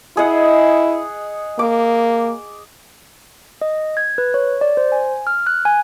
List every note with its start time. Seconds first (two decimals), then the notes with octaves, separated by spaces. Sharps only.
0.17 E4 G#4 D#5 F#5
1.59 A#3 D6
3.62 D#5
3.97 G#6
4.18 B4
4.34 C#5
4.61 D5
4.77 C5
4.92 G#5
5.27 F6
5.47 F#6
5.65 G#5